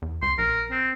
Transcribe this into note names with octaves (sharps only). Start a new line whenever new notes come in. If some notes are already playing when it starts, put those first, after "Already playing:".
E2
C#2 C6
A#1 A#4
C4